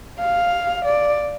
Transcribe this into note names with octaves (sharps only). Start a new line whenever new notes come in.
F5
D5